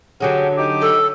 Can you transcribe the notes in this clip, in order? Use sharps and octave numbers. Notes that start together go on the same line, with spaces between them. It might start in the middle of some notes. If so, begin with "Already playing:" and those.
D3 F#3 C#4 G4 G#4 F#5
D#4 G4 D6
A4